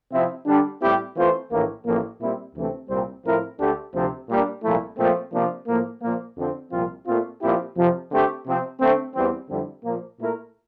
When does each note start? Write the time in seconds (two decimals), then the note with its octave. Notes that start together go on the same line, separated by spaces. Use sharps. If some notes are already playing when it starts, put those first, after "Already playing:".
0.12 C3 F3 C4 E4
0.47 D3 G3 D4
0.82 A2 G3 C4 E4 G4
1.17 E3 A3 C4 F4 C5
1.52 A#1 A2 E3 A#3
1.86 A1 A2 F3 A#3
2.21 A#2 G3 C4 E4
2.55 D2 C3 E3 A3 C4
2.90 C2 A#2 G3 C4
3.25 A2 F3 C4 E4 A#4
3.60 D2 D3 A3 D4 G4
3.94 D2 C3 F3 C4
4.29 A#2 G3 A#3 D4
4.64 C2 A#2 F3 A3 E4
4.98 A#2 F3 A3 C4
5.33 C3 F3 A#3 D4
5.68 A2 F3 A#3
6.02 A#2 F3 A#3
6.38 F2 D3 F3 C4
6.72 C2 A#2 F3 C4 F4
7.07 A#2 A3 C4 F4
7.42 A#2 F3 C4 E4 G4
7.77 F2 C3 F3
8.11 D3 A3 C4 G4
8.46 C3 F3 C4
8.80 D3 A3 C4
9.15 E2 E3 G3 C4
9.50 F2 D3 G3 C4 E4
9.84 A#2 F3 A#3
10.19 A#2 A3 E4 A#4